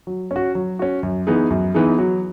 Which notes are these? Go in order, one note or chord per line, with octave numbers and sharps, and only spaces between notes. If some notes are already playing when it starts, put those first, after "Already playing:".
F#3
C#4
F#4
F#3
C#4 F#4
F#2
E3 B3 D#4 G#4
F#2
E3 B3 D#4 G#4
F#3